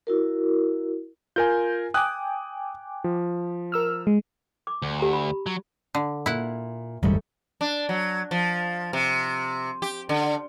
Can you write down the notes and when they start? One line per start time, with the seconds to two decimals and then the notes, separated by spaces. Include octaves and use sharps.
0.07 E4 F#4 A#4
1.36 F4 A#4 G#5 G6
1.94 G5 G#5 D6 D#6 F#6
3.04 F3
3.72 A#4 E6 F6
4.07 G#3
4.67 D6
4.82 D2
4.99 G4 A#5
5.13 B5
5.46 F#3
5.95 D3
6.26 A#2 E4 F#5
7.03 F#1 D#2 G#2 G3 A3
7.61 D4
7.89 F#3
8.31 F3
8.93 C3
9.82 G4
10.09 D3